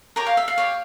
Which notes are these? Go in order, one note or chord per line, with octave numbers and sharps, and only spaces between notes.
G4 A#4 C#5 A#5
F5
E5
F5
G4 C#5